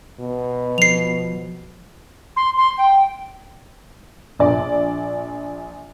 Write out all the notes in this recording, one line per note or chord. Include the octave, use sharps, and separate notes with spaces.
B2
F3 C7 F7
C6
C6
G5
A#1 D5